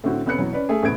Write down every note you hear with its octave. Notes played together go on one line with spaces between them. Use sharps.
A2 D3 C4 F#4
F1 B3 C#4 F#6 C#7
B2 E3 F#3
C#4 B4 D5
A3 G#4
A1 A2 C3 B3 G#6 D7